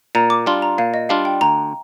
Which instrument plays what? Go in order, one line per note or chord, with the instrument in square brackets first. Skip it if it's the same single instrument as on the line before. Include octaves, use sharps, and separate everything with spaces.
[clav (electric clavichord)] A#2 [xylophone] A#5
[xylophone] D6
[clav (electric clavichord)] G3 D4 F4 [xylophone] C6
[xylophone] A#5
[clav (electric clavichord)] A#2 [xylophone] F5
[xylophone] D#5
[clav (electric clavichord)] G3 D4 F4 [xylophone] F5
[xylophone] G5
[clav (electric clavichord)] D2 [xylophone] A#5